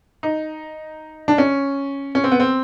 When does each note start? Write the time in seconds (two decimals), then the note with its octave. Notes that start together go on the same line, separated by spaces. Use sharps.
0.23 D#4
1.28 D4
1.38 C#4
2.15 C#4
2.24 C4
2.31 B3
2.40 C4